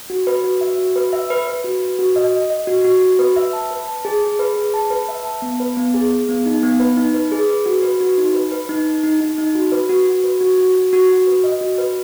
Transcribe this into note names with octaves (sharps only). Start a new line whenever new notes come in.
F#4
B4
F#4
E5
F#4
B4
E5
B4
B4
F#4
B4
F#4
D#5
D#5
D#5
F#4
F#4
F#4
B4
E5
A5
B4
A5
G#4
G#4
B4
G#4
A5
B4
E5
A5
B3
B4
B3
G#4
G#4
B3
D#4
B3
B4
D#4
B4
G#4
B4
F#4
B4
F#4
D#4
B4
B4
D#4
D#4
D#4
D#4
D#4
F#4
B4
F#4
F#4
B4
F#4
F#4
F#4
F#4
F#4
B4
D#5
F#4
B4